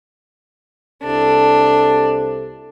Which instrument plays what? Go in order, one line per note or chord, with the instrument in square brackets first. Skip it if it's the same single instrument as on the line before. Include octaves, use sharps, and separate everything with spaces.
[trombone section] C2 C3 A4 [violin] D4